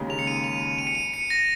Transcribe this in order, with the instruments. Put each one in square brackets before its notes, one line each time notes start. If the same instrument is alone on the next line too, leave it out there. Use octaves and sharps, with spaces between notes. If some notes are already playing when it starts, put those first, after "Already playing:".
Already playing: [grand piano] D#2 C#3 G#3 D#4
[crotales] F7
C#7
D#7
F7
D#7
C#7
D#7
C#7
A#6